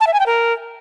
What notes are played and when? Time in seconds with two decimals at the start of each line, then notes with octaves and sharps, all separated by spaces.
0.01 A5
0.07 E5
0.13 G#5
0.20 G5
0.26 A#4